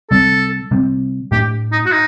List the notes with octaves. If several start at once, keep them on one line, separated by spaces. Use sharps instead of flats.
C3 G3 C4 A4
C3 G3 C4
A2 A3 D4 G4
D#4
F#4
D#4